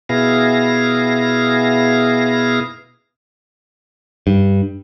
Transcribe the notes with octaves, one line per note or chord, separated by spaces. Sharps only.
B2 B3 E4 G#4 F5 A#6
G2